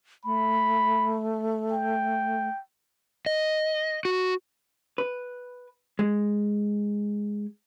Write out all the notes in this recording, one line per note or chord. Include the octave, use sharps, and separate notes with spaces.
A3 B5
G5
D#5
F#4
B4
G#3